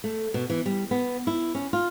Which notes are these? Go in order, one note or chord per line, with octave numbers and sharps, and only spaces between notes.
A3
B2
E3
G3
B3
E4
C#4
F4